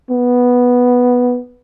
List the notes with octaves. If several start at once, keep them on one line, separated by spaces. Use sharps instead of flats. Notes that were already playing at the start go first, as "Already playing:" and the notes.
B3